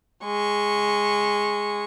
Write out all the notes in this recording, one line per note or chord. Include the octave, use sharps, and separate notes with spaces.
G#3 C#6